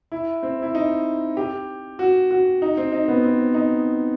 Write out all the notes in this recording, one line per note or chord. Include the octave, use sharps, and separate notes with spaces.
E4
C4
E4
D#4
G4
F#4
F#4
D#4
C4
D#4
B3
C4
D#4